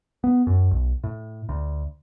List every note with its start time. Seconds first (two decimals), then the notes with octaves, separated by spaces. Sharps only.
0.24 B3
0.47 F#2
0.71 B1
1.04 A2
1.49 D2